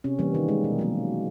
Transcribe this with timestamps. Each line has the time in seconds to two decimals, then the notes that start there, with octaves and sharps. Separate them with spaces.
0.04 C3 C#4
0.19 E3 G3 A#3
0.35 D#3
0.48 G#3
0.64 B2
0.79 F#3 A#3